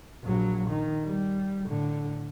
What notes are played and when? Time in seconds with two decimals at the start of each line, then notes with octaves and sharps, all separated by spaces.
0.23 A#1 F#3
0.69 D#3
1.05 G3
1.66 A2 D3